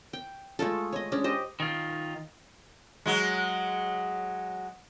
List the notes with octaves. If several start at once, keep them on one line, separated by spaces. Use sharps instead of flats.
G5
G#3 A3 F4 A4
C#5 D#5
G#3 C#4 D4
G4 C5 D#5
D#3 F4
F#3 G#3